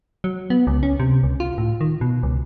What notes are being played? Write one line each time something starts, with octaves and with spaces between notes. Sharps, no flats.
F#3
B3
C#2
C#4
C3
C#2
F4
A2
D#3
B2
C#2